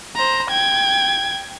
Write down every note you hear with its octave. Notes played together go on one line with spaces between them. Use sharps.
C5 A#5
G5 G#6